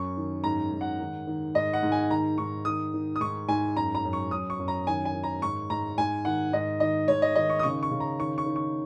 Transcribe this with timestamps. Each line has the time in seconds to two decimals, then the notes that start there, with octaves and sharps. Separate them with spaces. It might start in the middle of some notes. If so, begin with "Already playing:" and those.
Already playing: F#2 C#6
0.17 D#3
0.44 G#2 A#5
0.72 G#2
0.81 F#5
1.00 D#3
1.27 D#3
1.54 G#2 D#5
1.73 F#5
1.83 G#2
1.92 G#5
2.10 D#3 A#5
2.38 G#2 C#6
2.65 D#3 D#6
2.94 D#3
3.16 D#6
3.20 G#2 C#6
3.48 G#2 G#5
3.76 F#2 A#5
3.95 A#5
4.04 F#2
4.13 C#6
4.31 F#2 D#6
4.50 C#6
4.59 F#2
4.68 A#5
4.87 D#3 G#5
5.05 G#5
5.14 D#3
5.24 A#5
5.42 G#2 C#6
5.70 G#2 A#5
5.98 G#2 G#5
6.25 D#3 F#5
6.53 G#2 D#5
6.80 D#3 D#5
7.08 G#2 C#5
7.22 D#5
7.36 D#3 D#5
7.50 C#6
7.59 D#6
7.63 C#3 C#6
7.83 C#6
7.91 C#3
8.00 A#5
8.19 D#3 C#6
8.38 C#6
8.46 D#3
8.56 C#6